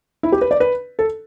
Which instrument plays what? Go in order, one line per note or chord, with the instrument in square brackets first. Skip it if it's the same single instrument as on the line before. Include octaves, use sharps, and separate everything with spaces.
[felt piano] E4
G4
B4
D5
B4
A4